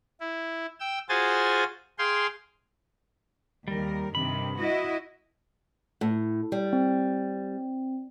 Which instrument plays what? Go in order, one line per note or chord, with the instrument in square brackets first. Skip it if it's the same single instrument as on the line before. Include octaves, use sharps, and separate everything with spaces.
[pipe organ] E4
G5 E6
F4 F#4 G#4 C5 G#5 A6
G#4 F5 G5 C6
[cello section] D#2 A#4 [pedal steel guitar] G3
[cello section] G2 C3 D#3 [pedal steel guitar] B5
[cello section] E4 F#4 D#5
[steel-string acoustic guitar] A2
G3
[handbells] C4